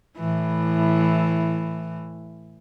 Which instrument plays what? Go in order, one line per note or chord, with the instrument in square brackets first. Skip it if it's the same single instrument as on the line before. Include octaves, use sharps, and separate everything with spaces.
[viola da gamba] A2 E3